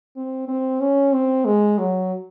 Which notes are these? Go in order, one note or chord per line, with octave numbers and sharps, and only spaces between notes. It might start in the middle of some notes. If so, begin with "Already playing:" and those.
C4
C4
C#4
C4
G#3
F#3